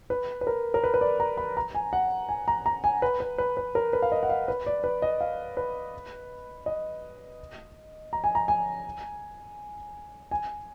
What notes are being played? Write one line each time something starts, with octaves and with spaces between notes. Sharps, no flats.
B4
B4
A#4
A#4
B4
B4
D5
A#5
B5
A#5
G#5
F#5
G#5
A#5
A#5
G#5
B4
B4
B4
B4
A#4
B4
F5
D#5
F#5
F5
B4
D5
B4
D#5
F5
B4
D#5
A#5
G#5
A#5
G#5
G#5